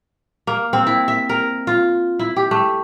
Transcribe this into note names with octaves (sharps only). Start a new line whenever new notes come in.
A#3
C4
E4
E5
A#4
F4
E4
G4
A3